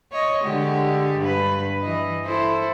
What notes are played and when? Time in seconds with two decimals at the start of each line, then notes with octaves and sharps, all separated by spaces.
0.12 C#5 D#5
0.43 D3 G#3 G4
1.19 G2 B4
1.82 E3 D#5
2.25 E4 A4 C5